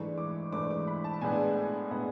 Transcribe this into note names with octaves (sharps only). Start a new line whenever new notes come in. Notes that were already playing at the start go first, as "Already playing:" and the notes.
Already playing: G#2 E3 A3 D4 C#6
D6
G#2 E3 A3 D4 D6
D6
B5
A5
A2 G#3 B3 D4 G#5
A2 G#3 B3 D4